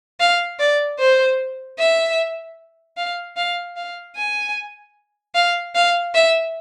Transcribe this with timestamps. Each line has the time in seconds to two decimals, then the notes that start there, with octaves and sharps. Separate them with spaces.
0.20 F5
0.59 D5
0.99 C5
1.78 E5
2.97 F5
3.36 F5
3.76 F5
4.16 G#5
5.35 F5
5.75 F5
6.14 E5